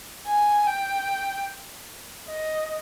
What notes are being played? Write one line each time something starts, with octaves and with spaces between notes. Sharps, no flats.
G#5
G5
D#5